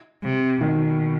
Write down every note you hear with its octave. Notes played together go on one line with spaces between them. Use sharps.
C3
B2 D#3